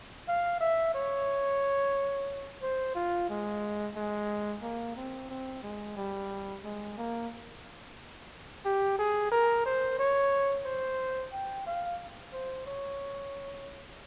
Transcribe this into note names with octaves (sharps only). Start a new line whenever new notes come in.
F5
E5
C#5
C5
F4
G#3
G#3
A#3
C4
C4
G#3
G3
G#3
A#3
G4
G#4
A#4
C5
C#5
C5
G5
F5
C5
C#5